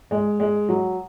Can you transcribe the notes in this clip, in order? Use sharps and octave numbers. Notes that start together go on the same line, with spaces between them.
G#3
G#3
F#3